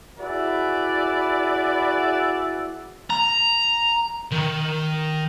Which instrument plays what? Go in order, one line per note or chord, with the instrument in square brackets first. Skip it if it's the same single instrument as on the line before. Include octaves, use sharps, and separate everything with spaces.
[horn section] E4 F#4 G#4 B4 D5 E5
[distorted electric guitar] A#5
D#3